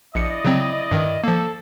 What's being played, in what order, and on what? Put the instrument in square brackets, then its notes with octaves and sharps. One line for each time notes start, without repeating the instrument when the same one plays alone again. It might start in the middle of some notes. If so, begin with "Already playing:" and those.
[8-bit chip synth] A#1 C#7 [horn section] E4 D5 D#5
[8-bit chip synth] C#3 F#3 C4
G2 D#3
[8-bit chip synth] F3 A#3 [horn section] A4